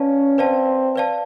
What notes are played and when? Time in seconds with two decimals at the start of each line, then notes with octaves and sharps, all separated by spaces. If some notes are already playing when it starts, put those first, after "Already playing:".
Already playing: C#4 B4 D5 F5 A5
0.38 C4 B4 D5 F5 A5
0.96 B4 D5 F5 A5